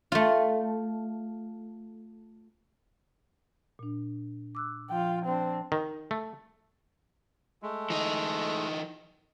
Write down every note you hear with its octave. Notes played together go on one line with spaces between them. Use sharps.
A3 F4
A#2 D4
D6 E6 F#6
F3 F4 G5
C4 D4
D#3
A3
G#3 A3
E3 D#4